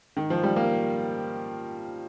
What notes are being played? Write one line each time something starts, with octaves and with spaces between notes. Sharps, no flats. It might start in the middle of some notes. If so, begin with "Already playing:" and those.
D#3
F3
G3
A#3